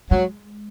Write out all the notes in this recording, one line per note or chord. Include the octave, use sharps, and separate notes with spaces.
F#3 G#3